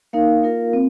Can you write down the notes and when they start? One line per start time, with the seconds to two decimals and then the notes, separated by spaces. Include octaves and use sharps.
0.13 A#3 D#4 A#4 F5
0.43 A#3 F4 A#4 F5
0.73 C4